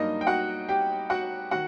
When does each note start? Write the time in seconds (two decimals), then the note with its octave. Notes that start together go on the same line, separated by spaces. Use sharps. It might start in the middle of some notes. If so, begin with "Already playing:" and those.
Already playing: G2 F#3 A#3 D#4 D#5
0.21 G5
0.27 F#4 F#5
0.69 G4 G5
1.10 F#4 F#5
1.51 D#3 F#4 F#5